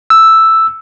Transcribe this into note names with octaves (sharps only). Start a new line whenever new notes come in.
E6